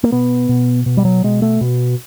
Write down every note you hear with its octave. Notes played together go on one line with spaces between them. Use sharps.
A#3
B2 B3
B2
B2
G3
F#3
B2 G#3
A3
B2